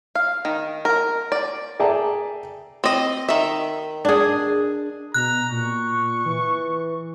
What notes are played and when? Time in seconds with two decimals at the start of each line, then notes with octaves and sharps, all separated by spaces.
0.15 F5
0.45 D#3
0.85 A#4
1.32 D5
1.79 G#4 D5 E5 G5 A5 A#5
2.84 C4 D#5
3.29 D#3 E5
4.05 D4 G#4
5.14 B2 A#5 F#6
5.51 A#2 C#6
6.26 E3